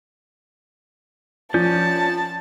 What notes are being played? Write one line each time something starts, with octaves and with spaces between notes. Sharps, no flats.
F3 C#4 D5 A5 G6